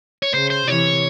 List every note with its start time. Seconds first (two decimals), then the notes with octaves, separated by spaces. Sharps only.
0.22 C#5
0.34 C#3 C5
0.50 C5
0.67 C3 E3 C#5